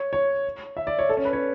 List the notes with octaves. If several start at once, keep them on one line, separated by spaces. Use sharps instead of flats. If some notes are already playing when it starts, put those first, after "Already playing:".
Already playing: C#5
C#5
E5
D5
C#5
A4
C#4
B4
C#5